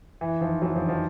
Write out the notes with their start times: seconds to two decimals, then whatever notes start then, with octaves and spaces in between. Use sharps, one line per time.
0.21 E3
0.41 D#3 F3
0.62 E3 F#3
0.76 D#3 F3
0.88 D#3 F3